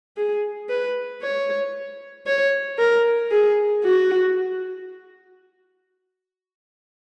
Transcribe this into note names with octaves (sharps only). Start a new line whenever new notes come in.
G#4
B4
C#5
C#5
A#4
G#4
F#4